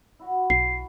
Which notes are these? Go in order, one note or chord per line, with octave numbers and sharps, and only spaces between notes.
E4 F#4 F#5
B1 C7